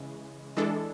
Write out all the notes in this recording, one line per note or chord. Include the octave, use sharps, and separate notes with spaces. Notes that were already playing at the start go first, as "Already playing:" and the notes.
Already playing: C#3 E3 G#3
E3 G#3 D4 A4